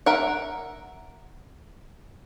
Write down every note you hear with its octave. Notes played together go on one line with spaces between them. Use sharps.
A#4 E5 F#5